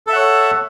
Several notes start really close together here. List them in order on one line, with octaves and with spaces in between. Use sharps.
A4 E5 F#5 C#5